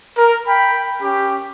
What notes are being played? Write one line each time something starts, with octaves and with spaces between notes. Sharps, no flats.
A#4
G5 B5
C#4 G4